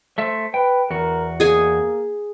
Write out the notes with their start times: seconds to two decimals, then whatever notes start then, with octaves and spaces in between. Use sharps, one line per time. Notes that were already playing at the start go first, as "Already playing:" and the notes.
0.18 A3 C5 E5
0.54 B4 G5
0.90 E2 F#4 A#4
1.40 A#3 G#4 G#5